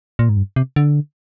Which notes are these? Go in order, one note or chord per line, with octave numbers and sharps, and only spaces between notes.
A#2
G#2
G2
C3
D3